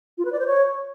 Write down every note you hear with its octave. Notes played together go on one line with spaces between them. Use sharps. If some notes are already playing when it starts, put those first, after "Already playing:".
F4
B4
D5
C5
C#5